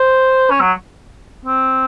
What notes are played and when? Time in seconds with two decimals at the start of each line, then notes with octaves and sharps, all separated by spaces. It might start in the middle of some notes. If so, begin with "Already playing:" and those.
Already playing: C5
0.50 C#4
0.61 F#3
1.45 C4